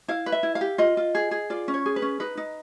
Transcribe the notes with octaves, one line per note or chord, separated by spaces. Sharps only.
E4 F5
B4
E5
E4
F5
G4
F4 D#5
F4
G#4
G#4
F4 D5
C#4
C#5
G#4
B4
C#4
D#4 B4
D#4